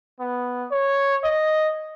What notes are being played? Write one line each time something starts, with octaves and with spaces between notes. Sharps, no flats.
B3
C#5
D#5